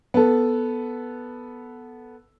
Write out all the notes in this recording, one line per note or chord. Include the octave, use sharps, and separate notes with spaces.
B3 A4